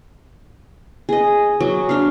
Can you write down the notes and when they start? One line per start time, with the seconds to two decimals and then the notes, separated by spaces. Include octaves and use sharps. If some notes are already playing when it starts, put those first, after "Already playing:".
1.09 G#4 D#5
1.60 F#3
1.89 D4 F5